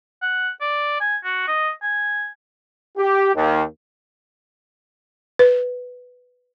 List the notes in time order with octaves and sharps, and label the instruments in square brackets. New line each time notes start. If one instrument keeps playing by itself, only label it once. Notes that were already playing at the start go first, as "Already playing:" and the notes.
[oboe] F#5
D5
G#5
F#4
D#5
G#5
[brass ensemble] G4
D#2
[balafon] B4